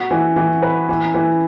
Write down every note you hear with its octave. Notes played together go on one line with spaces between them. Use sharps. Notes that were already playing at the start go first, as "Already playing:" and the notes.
Already playing: F#4
E3
E3
B4
E3
E3